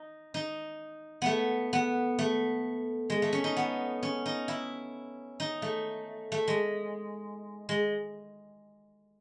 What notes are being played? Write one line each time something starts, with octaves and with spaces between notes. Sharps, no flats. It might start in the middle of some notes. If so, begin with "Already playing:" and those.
Already playing: D#4
D#4
A3 B3
B3
A3
G#3
A3
C#4
D#4
B3
C#4
D#4
E4
D#4
A3
A3
G#3
G#3